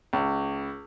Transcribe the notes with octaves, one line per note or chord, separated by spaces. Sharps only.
C#2